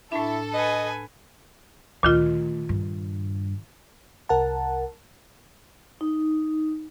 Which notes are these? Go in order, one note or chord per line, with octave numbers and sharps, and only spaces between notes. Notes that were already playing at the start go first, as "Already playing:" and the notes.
A2 D4 E4 A4
B4 D#5 G#5
D2 A#2 D#3 F4
G2
C2 A#4 F#5 A5
D#4